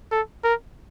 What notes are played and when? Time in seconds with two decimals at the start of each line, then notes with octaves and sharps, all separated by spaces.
0.12 A4
0.44 A#4